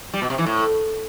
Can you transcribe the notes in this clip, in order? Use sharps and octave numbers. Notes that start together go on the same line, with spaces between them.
G3
B2
C3
E3
A2